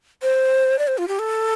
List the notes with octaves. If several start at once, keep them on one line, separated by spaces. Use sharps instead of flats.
C5
D5
C5
F4
G4
A4